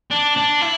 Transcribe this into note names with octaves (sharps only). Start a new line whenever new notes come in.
D4
D4
E4